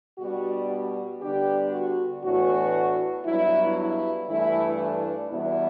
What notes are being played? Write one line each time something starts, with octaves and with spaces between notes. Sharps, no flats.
B2 G3 D4 F#4
F#4
D3 G3 B3 D4 G4
F#4
A2 E3 B3 D4 F#4
G2 F#3 B3 E4
E4
G2 E3 A3 E4
D4
E2 B2 G3 B3 E4